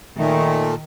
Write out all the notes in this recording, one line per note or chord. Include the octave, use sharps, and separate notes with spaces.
A#2 D#3 A3